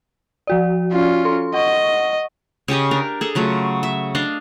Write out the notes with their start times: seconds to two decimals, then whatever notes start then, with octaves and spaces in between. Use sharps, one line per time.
0.47 F3 F#4 D5
0.92 C#4 F4
1.25 A4 C6
1.54 D#5 F#5 C#6
2.68 C#3 C#4 G4 D#5
2.91 D4 A#4
3.21 G#4 A4 A#5
3.35 C#3 F#3 A3 F4
3.83 E5
4.15 D4 D#5 F5